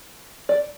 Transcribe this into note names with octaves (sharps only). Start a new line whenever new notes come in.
D5